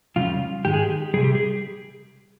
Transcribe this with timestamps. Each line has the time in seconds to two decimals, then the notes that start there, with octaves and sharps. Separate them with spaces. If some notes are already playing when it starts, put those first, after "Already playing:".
0.16 F2 C#3 G3 F4
0.65 G#2 D#3 G#3 G4
0.74 G#4
0.83 G4
1.14 C3 G3 G#4
1.24 G4
1.35 G#4